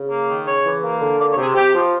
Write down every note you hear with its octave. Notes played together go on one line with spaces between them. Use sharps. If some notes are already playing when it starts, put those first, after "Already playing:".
Already playing: C#3
A#3
D#3
C#3 C#5
E3
A#3
D3
A#3 D5
C#5
C3
G#4
C3 G4
F3